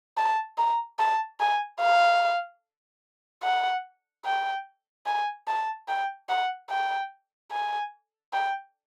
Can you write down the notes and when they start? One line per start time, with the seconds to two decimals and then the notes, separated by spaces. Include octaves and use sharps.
0.18 A5
0.58 A#5
0.99 A5
1.40 G#5
1.80 F5
3.43 F#5
4.26 G5
5.06 G#5
5.48 A5
5.88 G5
6.29 F#5
6.70 G5
7.52 G#5
8.33 G5